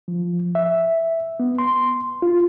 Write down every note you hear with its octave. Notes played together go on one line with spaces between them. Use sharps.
F3
E5
B3
C6
F4